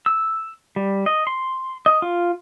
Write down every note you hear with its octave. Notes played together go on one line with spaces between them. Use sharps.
E6
G3
D#5
C6
D#5
F4